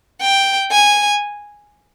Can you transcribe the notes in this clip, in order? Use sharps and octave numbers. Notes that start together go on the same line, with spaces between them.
G5
G#5